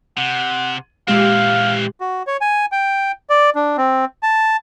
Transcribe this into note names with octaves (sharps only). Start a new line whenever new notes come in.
C3 F#5
A#2 E3 G#3 C4 G4 F5
F#4
C#5
G#5
G5
D5
D4
C4
A5